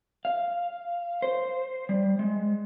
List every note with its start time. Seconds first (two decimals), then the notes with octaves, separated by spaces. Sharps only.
0.25 F5
1.22 C5
1.89 G3
2.19 G#3